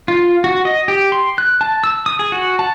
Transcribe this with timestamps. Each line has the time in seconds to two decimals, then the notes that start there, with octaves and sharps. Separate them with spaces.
0.08 F4
0.44 F#4
0.65 D#5
0.88 G4
1.12 C6
1.38 F#6
1.61 A5
1.84 E6
2.06 D#6
2.19 G#4
2.32 F#4
2.59 A5